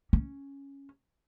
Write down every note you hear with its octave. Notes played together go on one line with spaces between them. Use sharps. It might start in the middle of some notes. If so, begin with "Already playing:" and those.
C#4